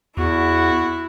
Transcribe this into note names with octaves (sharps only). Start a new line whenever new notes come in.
E2 E4 F#4